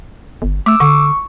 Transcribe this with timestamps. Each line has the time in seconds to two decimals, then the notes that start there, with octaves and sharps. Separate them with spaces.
0.42 G1
0.66 A3 D6 E6
0.80 D3 C#6